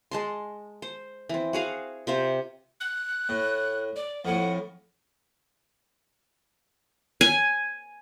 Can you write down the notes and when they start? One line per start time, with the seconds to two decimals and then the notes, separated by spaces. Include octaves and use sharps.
0.11 G#3 A5 C6
0.82 C5
1.29 E3 C4
1.53 F#4 G#4 F5 F#5
2.07 C3 F4 C5
2.80 F#6
3.29 A2
3.96 D5
4.25 F2 A2 F#5
7.21 G#5